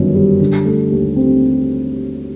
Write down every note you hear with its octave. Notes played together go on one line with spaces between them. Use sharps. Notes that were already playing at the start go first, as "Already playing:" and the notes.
Already playing: G1 F#2 D#3
G3
D3
A3
D#2
C4